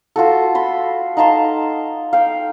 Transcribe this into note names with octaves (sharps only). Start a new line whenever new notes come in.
F4 F#4 A4
B5 C6
D#4 F5 A5 C6
F5 G5